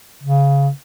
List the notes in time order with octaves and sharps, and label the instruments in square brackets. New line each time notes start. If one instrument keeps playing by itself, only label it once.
[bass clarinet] C#3